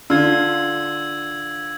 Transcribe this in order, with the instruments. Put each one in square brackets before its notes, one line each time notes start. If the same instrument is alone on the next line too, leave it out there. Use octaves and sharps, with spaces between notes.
[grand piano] D3 F4 [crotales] E6 G#6